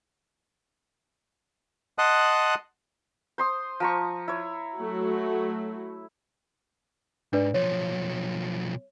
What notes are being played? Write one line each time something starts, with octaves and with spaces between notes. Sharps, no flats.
D#5 F#5 A5 C6 D#6 F#6
C5 C6 D#6
F3 A#5 C#6
E4 C#5
F#3 A3 F#4
G#2 D4 B4 D5
B1 F3 C#5